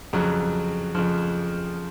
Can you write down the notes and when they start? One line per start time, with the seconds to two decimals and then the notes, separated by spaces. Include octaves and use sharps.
0.13 F2 C#3 F#3
0.95 F2 C#3 F3